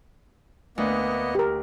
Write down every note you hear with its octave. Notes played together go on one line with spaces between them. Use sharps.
D2 A#3 B3 D#5
G4 A#4